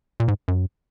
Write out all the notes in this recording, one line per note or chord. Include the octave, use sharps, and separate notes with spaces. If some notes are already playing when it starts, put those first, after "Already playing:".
A#2
G#2
F#2